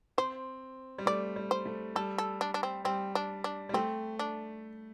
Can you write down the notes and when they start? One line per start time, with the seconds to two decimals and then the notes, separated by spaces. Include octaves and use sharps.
0.18 C4 C5
0.98 G3
1.06 A3 D5
1.36 G3
1.51 C5
1.66 A3
1.95 G3 A4
2.18 A4
2.41 D4
2.54 D4
2.63 C4
2.85 G3 C4
3.15 D4
3.44 D4
3.69 G3
3.74 A3 C4
4.19 D4